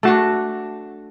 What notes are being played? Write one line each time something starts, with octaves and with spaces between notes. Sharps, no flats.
A3 D4 F#4 A5